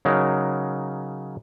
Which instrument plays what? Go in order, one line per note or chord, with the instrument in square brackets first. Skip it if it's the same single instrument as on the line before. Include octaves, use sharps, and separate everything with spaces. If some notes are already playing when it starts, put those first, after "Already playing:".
[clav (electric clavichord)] C#3 F#3 D#4 A#4